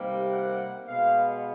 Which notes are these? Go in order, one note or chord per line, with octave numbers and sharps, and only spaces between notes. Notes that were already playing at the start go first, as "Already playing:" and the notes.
Already playing: C3 D#3 G3 A#3
F#5
B2 G#3 B3 F5